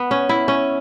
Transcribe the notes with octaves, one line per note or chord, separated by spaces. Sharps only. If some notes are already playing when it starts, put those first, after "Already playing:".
Already playing: B3
C#4
E4
C#4